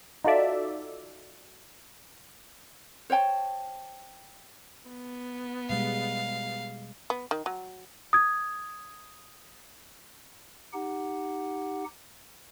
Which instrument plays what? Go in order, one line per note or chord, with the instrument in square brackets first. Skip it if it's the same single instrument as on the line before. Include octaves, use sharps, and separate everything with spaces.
[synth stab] D#4 F4 F#4 A4 D5 E5
[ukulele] C5 C#5 G5 A5
[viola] B3
[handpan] B2 G3 G#3 [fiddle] F5
[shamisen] B3
D#3
F#3
[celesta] D#6 G#6
[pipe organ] D#4 G4 F#5